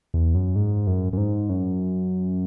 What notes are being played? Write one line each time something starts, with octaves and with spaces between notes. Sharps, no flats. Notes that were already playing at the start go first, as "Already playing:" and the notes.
E2
F#2
G#2
F#2
F#2
G#2
F#2